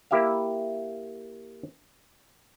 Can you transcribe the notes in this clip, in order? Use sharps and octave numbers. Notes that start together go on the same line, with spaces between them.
A#3 E4 G4 E5 F5